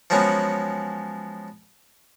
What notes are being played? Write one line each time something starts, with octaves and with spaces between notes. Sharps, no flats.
F3 F#3 G#3 B3 C#4